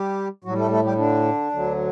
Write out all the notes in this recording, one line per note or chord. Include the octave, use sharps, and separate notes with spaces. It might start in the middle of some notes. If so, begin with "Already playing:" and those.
Already playing: G3 G4
A2 F#3 G3 F#4
A3 A4
A3 A4
G3 G4
D3 D4
D2 D3 F#3